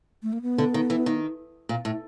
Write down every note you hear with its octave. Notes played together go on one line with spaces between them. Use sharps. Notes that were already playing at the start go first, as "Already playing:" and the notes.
A3
A#3
B3
D3
D#3
E3
D#3
A#2
A2